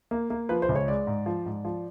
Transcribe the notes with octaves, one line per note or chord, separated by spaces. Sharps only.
A#3
A#3
F3 B4
C5
C#2
C#5
G#3 D5
G#2
F3
G#2
F3